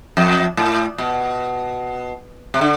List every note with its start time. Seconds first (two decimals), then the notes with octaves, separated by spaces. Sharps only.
0.17 F2
0.57 A2
0.98 B2
2.54 C3
2.61 D3